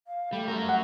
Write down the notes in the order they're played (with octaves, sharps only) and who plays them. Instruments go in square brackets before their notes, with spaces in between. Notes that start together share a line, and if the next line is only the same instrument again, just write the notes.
[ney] F5
[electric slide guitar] G3 [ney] A3
[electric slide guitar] F#3 A#4
[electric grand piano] F#5